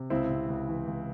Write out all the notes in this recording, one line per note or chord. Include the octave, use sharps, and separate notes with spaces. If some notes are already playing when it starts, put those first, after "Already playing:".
Already playing: C3
C#2 C4 E4
C3
C#2
E3
C#2